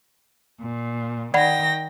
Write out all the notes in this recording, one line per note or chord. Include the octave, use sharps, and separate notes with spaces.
A#2
D#3 D5 F#5 G5 B5 A#6